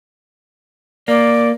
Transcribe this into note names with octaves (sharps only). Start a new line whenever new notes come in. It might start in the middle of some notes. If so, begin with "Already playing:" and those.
A#3 D5